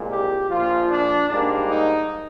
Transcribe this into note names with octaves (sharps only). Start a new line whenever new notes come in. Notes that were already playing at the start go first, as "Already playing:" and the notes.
Already playing: C2 A#2 G#3
G4
A#1 A#2 F3 F4
D4
G#2 G3 A#3 D4
D#4